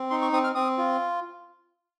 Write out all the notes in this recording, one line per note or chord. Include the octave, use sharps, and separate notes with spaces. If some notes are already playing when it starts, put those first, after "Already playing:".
Already playing: C4
D#4 C6
C#6
C4 D#6
F6
C4 D#6
F4